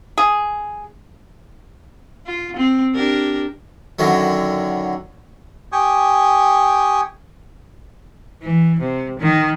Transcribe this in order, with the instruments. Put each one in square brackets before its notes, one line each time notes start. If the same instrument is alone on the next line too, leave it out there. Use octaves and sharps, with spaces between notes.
[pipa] G#4
[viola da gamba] F4
C4
D4 G4 A#4
[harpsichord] F#2 D3 D#3 F#3
[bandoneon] G4 G5 G#5 C#6 D#6
[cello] E3
C3
D#3